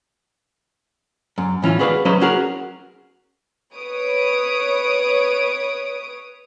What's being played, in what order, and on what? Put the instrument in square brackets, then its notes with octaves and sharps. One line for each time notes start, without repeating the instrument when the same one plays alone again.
[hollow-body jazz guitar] F#2
A2 E3 C#4 F4
F#4 G#4 B4 D5 F5
F#3 C#4 B4 C5 D#5
C#4 F#4 G#4 A#4
[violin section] B4 C#5 D#6 D7